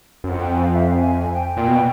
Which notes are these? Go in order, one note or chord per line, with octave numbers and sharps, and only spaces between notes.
F#2
F2 F#5
G5
G#5
F5
E5
F5
G#5
G5
A#2
B2